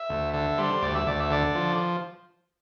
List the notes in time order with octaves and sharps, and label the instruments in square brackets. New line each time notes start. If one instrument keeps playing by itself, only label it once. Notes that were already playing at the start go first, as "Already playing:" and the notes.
Already playing: [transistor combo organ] E5
D2
D3 E5
G3 C5
D2 D5
E5
D2 D5
E5
D3 D5
F3